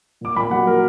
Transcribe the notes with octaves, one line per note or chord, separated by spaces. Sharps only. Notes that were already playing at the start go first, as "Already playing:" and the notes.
A#2 D6
A#2 B5
F#3 F#5
F#3 A#4